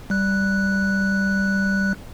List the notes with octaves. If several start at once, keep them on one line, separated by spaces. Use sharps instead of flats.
G3 F#6